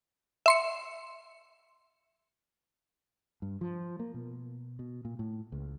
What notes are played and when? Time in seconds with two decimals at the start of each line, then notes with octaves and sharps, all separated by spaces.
0.46 E5 C6 C#7
3.42 G2
3.61 F3
3.99 A#3
4.14 B2
4.79 B2
5.05 A#2
5.19 A2
5.52 C#2